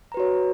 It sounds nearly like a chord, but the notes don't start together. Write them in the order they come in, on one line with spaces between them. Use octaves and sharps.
A#5 B4 F#4 C#5